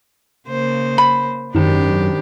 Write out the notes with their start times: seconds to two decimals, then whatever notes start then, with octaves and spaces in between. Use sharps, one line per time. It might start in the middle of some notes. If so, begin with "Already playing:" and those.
0.48 C#3 A#3 C5
0.98 B5
1.55 G#1 F#2 D#3 D4 G4